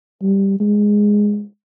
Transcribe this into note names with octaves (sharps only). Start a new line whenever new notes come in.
G3
G#3